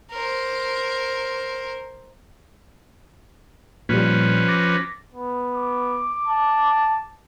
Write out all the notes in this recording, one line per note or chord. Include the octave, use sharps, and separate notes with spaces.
A#4 C5
A#2 F3 G3 C#4 B4
D6 A6 A#6
B3
D6
A5